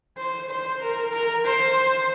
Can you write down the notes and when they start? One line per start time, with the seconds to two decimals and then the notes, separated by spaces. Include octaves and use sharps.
0.17 C5
0.50 C5
0.81 A#4
1.13 A#4
1.45 C5